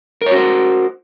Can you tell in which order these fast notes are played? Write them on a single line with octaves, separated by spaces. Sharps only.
A#4 C#5 F#4 C5